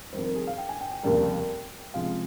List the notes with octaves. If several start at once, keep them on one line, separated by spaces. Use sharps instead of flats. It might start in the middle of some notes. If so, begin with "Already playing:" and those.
F2 D#3 G3 C5
A#4
G#4
F5
G5
G#5
G5
G5
F1 D#2 C#3 G3 A#3
C#2 C3 F3 G#3 F5